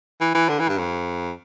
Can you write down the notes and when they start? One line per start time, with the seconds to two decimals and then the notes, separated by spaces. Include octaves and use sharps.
0.21 E3
0.34 E3
0.49 D3
0.59 E3
0.68 G2
0.78 F2